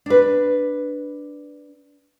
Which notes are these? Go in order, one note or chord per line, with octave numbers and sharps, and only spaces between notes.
D4 B4